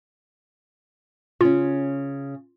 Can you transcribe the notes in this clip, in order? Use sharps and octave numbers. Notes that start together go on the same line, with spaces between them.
C#3 C#4 F4